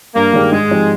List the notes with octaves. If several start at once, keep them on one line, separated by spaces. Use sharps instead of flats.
G2 A#3
D#3 G#3 D4 G4
G#2 G#3
F3 C4 D#4 G4